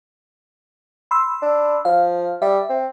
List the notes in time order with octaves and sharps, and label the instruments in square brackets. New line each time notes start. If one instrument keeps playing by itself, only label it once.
[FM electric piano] B5 C6 E6
[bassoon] D4
[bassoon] F3 [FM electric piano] F5
[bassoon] G3 [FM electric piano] E5
[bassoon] C4